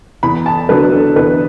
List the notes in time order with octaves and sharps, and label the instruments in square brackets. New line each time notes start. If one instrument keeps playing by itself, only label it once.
[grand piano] E2 B5
A5
D3 F#3 B4
A4
E2 B4